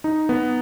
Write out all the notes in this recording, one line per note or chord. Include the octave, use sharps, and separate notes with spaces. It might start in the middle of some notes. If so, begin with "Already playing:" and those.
D#4
B3